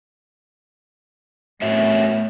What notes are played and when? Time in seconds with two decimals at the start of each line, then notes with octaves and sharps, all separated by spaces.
1.62 A2 B3 F#4 C#5 E5